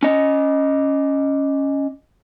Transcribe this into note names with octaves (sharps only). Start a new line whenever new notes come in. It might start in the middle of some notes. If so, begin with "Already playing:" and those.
C#4 D#5